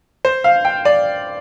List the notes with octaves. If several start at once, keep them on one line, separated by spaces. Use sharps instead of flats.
C5
F5
G5
D5